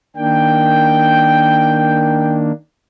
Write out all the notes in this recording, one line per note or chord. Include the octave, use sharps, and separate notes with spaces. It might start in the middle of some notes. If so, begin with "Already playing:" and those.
D#3 A#3 D4 G5